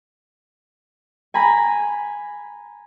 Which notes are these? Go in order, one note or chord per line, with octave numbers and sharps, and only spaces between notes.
G#5 A#5 B5 G#6